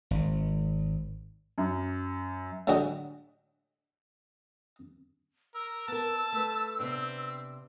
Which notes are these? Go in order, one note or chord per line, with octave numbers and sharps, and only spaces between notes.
G#1
F#2
A2 D3 F#3 G#3 F#4 G4
A#4 E6
B3 A#4 A5
A3 B4
C3 B3 C4 D4